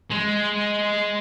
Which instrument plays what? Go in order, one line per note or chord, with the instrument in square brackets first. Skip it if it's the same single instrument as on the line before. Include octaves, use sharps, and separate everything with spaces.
[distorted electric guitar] G#3